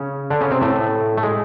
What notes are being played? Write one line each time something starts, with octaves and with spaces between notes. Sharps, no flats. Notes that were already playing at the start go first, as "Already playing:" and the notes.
Already playing: C#3 C#4
D3 D4
C#3 C#4
C3 C4
A2 A3
A3
G#3